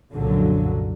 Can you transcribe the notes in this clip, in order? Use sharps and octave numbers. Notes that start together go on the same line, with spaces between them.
C2 F#2 A#2 D3 F3 F#3